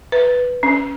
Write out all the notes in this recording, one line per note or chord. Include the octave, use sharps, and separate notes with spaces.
B4
C#4